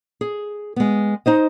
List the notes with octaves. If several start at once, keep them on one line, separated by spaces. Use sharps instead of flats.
G#4
G#3 B3
D#4 C5 D#5